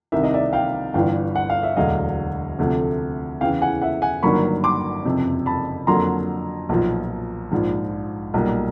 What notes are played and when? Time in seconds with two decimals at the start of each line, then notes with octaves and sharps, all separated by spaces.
0.12 C2 C3 D#3 E5
0.23 D#5
0.33 D5 E5
0.53 F5 G5
0.94 G1 G2 E3 F5 G5
1.36 F#5
1.50 F5
1.63 E5
1.77 E1 D2 D3 F#3 D#5 F5
2.59 D2 C3 F3 A3
3.41 E2 C#3 E3 F5 G5
3.61 F#5 G#5
3.82 E5 F#5
4.02 F#5 G#5
4.23 G1 G2 D#3 F#3 A#3 B5 C#6
4.64 C6 D6
5.05 F#1 F2 C3
5.46 A5 B5
5.87 F2 D3 F#3 A#3 A#5 C6
6.69 B1 A#2 F3
7.52 A#1 G#2 F3
8.34 B1 A#2 G3 A#3